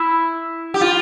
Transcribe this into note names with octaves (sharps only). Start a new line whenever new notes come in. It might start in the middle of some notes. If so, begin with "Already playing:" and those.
Already playing: E4
G4
F4